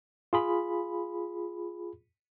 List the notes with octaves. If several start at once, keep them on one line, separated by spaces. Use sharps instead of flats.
F4 G#4 B5